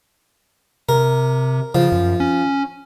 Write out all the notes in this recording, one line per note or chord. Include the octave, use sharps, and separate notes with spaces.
C3 A#4
C#3 F3
F#2
C#4